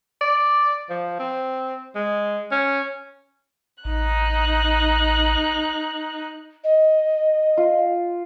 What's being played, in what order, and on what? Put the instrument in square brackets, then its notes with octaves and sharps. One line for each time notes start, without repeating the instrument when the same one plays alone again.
[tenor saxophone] D5
F3
C4
G#3
C#4
[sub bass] A1 [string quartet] D#4 F#6
[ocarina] D#5
[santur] F4